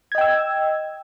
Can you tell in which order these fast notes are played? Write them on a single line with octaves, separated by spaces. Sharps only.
G#6 D#5 G5 E6